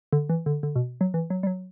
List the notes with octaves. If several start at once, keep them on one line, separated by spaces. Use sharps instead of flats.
D3
E3
D3
D3
B2
F#3
E3
F#3
G3
F#3